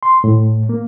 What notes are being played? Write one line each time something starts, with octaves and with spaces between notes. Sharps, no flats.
C6
A2
A#3